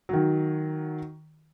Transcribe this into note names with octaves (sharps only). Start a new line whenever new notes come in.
D#3 F#3